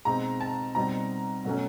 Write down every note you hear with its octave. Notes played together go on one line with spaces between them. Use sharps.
B2 G#3 C4 D#4 A#5
A5
B2 G3 C4 D#4 A#5
B2 F#3 A3 C#4